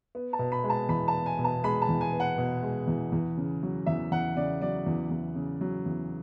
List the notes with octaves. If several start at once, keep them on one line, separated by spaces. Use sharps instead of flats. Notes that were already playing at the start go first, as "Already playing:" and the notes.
B3
A5
B2
B5
G#3
A5
E2 B5
A5
B3
G#5
B2
A5
G#3 B5
A5
E2
G#5
B3
F#5
B2
G#3
E2
E2
C#3
F#3
E2 E5
E2 F#5
C#3 D5
F#3 D5
E2
E2
C#3
F#3
E2